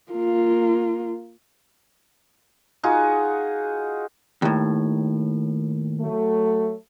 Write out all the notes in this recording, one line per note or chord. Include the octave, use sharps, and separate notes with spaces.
A#3 F4
D#4 F4 F#4 G#4
D#2 A2
F#3 A3